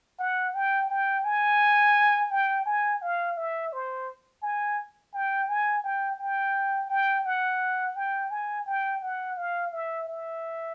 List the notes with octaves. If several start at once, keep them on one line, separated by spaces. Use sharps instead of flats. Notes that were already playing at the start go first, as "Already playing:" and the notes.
F#5
G5
G5
G#5
G5
G#5
F5
E5
C5
G#5
G5
G#5
G5
G5
G5
F#5
G5
G#5
G5
F#5
F5
E5
E5